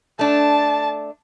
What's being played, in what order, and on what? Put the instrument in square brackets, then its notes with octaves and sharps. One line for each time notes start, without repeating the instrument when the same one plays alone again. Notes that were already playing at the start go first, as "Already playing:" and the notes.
[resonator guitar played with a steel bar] A3 D4 [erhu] A5